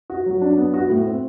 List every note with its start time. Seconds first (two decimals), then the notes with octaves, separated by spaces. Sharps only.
0.10 F#4
0.26 F#3
0.41 D4
0.57 B3
0.74 F#4
0.90 A2
1.06 C4